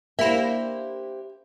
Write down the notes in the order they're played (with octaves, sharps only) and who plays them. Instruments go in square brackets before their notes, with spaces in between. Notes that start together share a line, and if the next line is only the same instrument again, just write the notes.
[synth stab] A#3 E4 [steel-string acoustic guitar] D4 G4 C5 [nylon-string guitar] E5